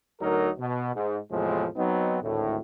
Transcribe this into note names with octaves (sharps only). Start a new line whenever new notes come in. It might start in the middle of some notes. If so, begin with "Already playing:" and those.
D2 F#3 D#4 A#4
B2
G#2
E2 A2 C3 F3 G#3
F#3 B3 C4 D#4
G#1 D2 A2